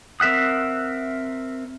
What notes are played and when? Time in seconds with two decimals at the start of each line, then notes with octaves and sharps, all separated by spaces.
0.20 C4 A#4 E5 F#5 D#6